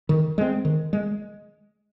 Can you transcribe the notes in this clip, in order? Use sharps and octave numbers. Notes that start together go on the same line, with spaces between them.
D#3
G#3 C4
D#3
G#3